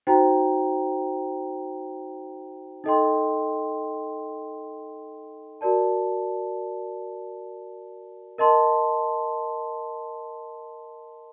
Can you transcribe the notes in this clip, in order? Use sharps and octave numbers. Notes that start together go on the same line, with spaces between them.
D#4 F#4 C5 G5 A#5
D#4 A4 D#5 G5 C6
F#4 A#4 D5 A5
A#4 D#5 A5 C6